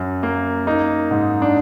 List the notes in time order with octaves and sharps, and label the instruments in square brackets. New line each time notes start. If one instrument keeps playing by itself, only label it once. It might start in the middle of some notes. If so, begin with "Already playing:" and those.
Already playing: [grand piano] F#2
A#3
A#3 D#4
G#2
D4